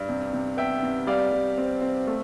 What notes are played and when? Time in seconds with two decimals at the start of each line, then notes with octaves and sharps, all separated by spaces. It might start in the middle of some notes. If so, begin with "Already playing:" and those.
Already playing: G2
0.09 C3
0.33 C3
0.57 B3 E5 G5
0.83 C3
1.07 G3 D5 F5
1.32 G3
1.58 C4
1.81 C4
2.07 A3